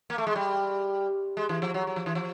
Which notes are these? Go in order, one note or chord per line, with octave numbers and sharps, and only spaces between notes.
A#3
A3
G#3
G3
G#3
E3
F3
F#3
F#3
F3
E3
F3